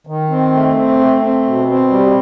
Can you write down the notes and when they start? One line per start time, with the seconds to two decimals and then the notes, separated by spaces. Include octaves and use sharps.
0.07 D#3
0.30 C4
0.53 A3
0.75 C4
0.99 A3
1.21 C4
1.45 B2
1.68 C4
1.90 G3